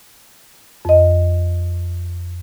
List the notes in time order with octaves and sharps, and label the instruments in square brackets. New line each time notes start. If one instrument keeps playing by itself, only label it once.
[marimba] F2 D#5